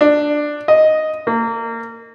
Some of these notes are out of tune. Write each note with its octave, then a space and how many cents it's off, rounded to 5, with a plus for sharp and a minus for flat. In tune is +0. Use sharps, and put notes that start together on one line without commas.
D4 +10
D#5 +0
A#3 -25